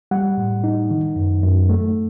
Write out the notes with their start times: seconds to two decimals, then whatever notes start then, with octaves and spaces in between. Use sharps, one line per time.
0.11 G3 F#5
0.37 A2
0.64 D#4
0.91 D#3
1.16 F#2
1.43 F#2
1.69 A3